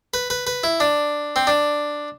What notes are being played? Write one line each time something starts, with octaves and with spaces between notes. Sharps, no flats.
B4
B4
B4
E4
D4
C4
D4